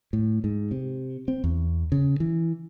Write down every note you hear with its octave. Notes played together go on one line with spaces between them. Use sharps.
A2
G#2
C3
C4
E2
C#3
E3